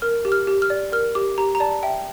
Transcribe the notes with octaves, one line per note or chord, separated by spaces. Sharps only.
A#4 F6
G4
F6
G4
F6
D5
A#4 F6
G4 D6
G4 A#5
A#5
D5 A5
E5 G5